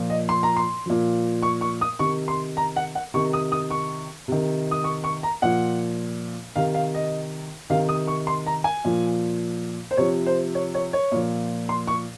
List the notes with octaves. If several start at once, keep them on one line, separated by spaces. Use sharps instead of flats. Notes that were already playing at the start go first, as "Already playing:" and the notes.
Already playing: A#2 F3
D#5
C6
A#5
C6
A#2 F3
C#6
C#6
D#6
C3 D#3 C#6
C6
A#5
F#5
F#5
C3 D#3 C#6
D#6
D#6
C#6
C3 D#3
D#6
C#6
C#6
A#5
A#2 F3 F#5
C3 D#3 F5
F5
D#5
C3 D#3 F5
D#6
C#6
C6
A#5
G#5
A#2 F3
C5
C3 F3 C#5
C5
C#5
C#5
C#5
A#2 F3
C6
C#6